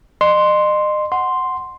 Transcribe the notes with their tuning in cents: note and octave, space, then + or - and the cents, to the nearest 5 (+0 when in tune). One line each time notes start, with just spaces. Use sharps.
D#5 -35 C6 +0
F#5 +0 C6 +0